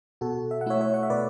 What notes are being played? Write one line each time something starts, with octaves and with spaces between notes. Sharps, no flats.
B2 F#4 A4
E5
F#5
A3 E4 C#5 E5
C#5 E5
F#5
E5
B2 B4 D5